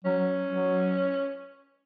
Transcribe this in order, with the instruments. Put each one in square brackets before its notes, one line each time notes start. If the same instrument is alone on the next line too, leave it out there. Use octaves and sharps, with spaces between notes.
[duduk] F#3 [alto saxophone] C#4
[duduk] F#3